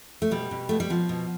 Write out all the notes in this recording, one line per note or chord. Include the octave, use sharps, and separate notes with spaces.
A3
B2 G3
B2
B2 A3
G3
B2 F3
B2